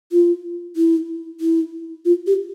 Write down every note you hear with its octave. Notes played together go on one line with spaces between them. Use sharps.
F4
E4
E4
F4
G4